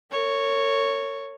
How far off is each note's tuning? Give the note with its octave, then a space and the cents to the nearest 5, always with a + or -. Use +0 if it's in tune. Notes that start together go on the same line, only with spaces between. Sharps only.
A#4 -40 C#5 +0